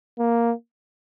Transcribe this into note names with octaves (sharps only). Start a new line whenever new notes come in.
A#3